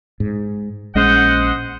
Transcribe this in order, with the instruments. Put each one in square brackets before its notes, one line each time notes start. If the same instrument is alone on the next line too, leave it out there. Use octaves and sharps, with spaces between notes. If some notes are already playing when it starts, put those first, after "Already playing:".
[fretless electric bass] G#2
[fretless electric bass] A#1 G#3 C#4 [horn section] C5 D#5 F#5